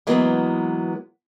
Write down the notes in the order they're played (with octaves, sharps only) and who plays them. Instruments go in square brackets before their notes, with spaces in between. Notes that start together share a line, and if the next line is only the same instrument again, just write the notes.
[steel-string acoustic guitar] E3 F#3 G#3 A#3 B3